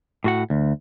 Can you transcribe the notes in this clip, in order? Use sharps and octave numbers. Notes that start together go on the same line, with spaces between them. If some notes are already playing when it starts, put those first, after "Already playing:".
A2 F#4 F#5
D2